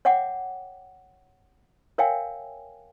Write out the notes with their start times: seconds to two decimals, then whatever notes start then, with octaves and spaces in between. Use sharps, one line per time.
0.05 C#5 E5 F#5 G5 D6
1.98 A#4 C#5 E5 F5 G5 G#5